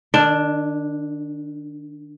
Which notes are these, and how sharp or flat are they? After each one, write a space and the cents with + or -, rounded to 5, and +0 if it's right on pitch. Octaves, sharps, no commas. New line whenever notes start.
D#3 -35 D4 +0